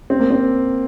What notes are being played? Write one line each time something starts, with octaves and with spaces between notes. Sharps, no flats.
C4
A#3
C4